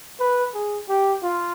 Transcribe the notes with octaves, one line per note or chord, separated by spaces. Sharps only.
B4
G#4
G4
F4